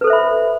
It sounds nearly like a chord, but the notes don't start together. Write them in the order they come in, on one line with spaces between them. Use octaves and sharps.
B4 A4 C5 E5 B5